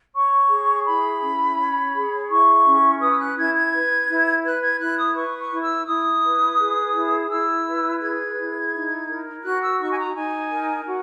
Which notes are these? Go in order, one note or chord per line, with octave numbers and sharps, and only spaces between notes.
C#5 C#6
G#4
E4 B5
C#4
C#5
G#4
E4 C#6
C#4
B4 D#6
E6
F#6
E4 G#6
G#6
B4
E4
B4 F#6
G#6
E4 F#6
D#6
B4 C#6
C#6
E4
E6
E4 D#6
B4
G#4
E4
E4 E6
B4
G#4 G#6
E4
D#4
A#4
F#4 F#6
E6
D#4 C#6
G#5
A#5
D#4 G#5
A#4
F#4